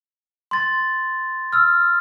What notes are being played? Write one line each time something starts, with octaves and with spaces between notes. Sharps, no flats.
C6 A6
E6 F6